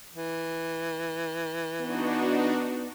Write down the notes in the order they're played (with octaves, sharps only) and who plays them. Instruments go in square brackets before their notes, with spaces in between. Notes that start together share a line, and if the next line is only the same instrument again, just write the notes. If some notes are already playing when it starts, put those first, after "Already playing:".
[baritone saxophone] E3
[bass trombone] B3 [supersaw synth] D4 D#4 F#4